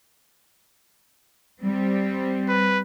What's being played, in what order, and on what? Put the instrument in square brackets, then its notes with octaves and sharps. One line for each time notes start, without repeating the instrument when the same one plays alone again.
[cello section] G3 C4
[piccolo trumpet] B4